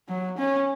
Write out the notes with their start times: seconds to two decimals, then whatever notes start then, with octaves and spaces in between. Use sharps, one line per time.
0.08 F#3
0.38 C#4